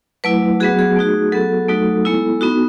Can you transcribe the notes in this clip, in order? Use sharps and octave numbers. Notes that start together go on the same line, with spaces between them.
F#3 A3 E4 B4
F#3 B3 F#4 G#4
G#4
A3 D#4 F#4
F#3 B3 F#4 A4
F#3 A3 D#4 F#4
G#3 B3 E4
B3 D#4 F#4